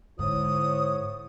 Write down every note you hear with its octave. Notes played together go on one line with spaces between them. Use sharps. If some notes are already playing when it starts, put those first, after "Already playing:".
G#2 D3 E4 C5 C#5 D#6